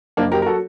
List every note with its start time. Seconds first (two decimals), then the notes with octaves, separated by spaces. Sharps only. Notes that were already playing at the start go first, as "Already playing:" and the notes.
0.17 F#1 A#3 D4
0.31 F#3 G4 A#4
0.42 A#4
0.46 F#4 A4